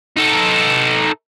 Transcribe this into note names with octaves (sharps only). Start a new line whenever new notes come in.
D#4 A4